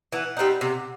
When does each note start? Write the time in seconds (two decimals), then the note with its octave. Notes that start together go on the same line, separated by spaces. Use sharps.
0.12 E3 F#5
0.37 G3 C4 D#4
0.61 C3